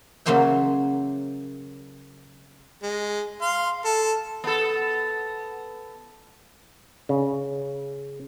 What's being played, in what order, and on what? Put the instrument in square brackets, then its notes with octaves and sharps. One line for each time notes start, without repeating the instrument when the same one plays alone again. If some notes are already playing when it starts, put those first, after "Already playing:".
[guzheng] C#3 F#3 A#3 C5 E5 G5
[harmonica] G#3
F5 C6
A4
[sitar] B3 A4
[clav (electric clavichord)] C#3